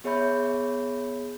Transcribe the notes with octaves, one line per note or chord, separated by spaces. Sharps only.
B3 G#4 C#5 E5 B5 G6